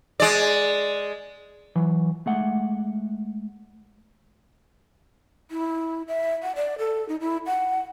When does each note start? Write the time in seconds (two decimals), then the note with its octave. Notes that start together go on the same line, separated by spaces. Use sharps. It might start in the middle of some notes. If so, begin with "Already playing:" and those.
0.20 G#3 D5
1.76 E3 F#3
2.26 G#3 A3 F#5
5.51 E4
6.08 E5
6.43 F#5
6.56 D5
6.78 A4
7.09 D#4
7.21 E4
7.46 F#5